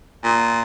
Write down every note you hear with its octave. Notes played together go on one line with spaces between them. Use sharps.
A#2